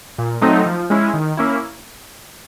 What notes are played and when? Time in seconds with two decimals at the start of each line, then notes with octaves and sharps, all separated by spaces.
0.19 A#2
0.42 F#3 A3 C4 D#4
0.66 F3
0.90 G#3 C#4 E4
1.14 D#3
1.37 A#3 C#4 E4